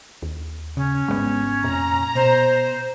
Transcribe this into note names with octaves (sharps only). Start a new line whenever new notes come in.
D#2
C#3 C#4
G#1 B2 G#3 B3
F1 A#2 A#5
B2 C5